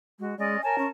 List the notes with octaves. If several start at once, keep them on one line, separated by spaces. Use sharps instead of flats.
G#3 F#4
G#3 C#4 D5 D#5
A#4 C#5 G#5 A5
C#4